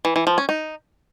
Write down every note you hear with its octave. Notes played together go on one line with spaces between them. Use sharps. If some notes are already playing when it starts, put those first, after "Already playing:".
E3
E3
F3
C#4
D#4